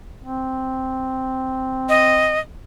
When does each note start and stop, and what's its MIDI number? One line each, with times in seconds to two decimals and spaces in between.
0.24 2.44 60
1.89 2.39 75